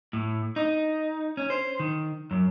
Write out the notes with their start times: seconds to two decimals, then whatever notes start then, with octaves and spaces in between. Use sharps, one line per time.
0.13 A2
0.56 D#4
1.37 C#4
1.50 C5
1.79 D#3
2.31 F#2